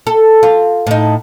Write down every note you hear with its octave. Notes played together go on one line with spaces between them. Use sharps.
A4
F4
A2 D#4